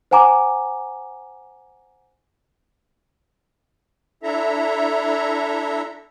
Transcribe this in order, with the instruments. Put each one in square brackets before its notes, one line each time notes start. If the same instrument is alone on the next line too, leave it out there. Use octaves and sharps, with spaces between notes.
[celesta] C5 F#5 G#5 A#5 D6
[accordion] D4 E4 A4 E5 A#5